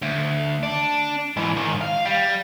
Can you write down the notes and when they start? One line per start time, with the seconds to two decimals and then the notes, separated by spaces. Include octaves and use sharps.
0.02 D2
0.63 D4
1.37 G#2 E3
1.56 G#2 D#3
1.81 F5
2.05 G3